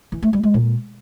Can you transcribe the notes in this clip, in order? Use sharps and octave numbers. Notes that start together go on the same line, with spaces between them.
E3
A3
G3
G#3
A#2